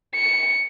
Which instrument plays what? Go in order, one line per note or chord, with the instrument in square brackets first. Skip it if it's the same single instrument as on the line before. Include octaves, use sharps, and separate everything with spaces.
[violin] C#7